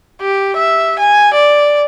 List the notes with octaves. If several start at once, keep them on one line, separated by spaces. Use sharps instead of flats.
G4
E5
G#5
D5